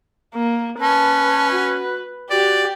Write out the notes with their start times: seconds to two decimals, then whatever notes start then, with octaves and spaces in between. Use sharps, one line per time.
0.35 A#3
0.80 C#4 B4 A5
1.51 F#4
2.30 F#4 G4 D5